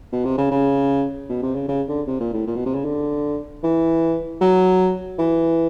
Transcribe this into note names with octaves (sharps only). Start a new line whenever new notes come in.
B2
C3
C#3
C#3
B2
C3
C#3
C#3
D3
C3
A#2
A2
A#2
B2
C3
C#3
D3
E3
F#3
E3